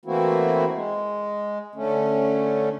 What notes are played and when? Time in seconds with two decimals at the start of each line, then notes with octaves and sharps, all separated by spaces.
0.05 E3 A3 A#3 C4 E4 F#4
0.72 G#3
1.75 D3 A3 C#4